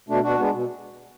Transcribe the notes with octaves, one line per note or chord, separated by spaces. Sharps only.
B2 A3 D4
B2 D4 F#4
G#3 B3 D4
B2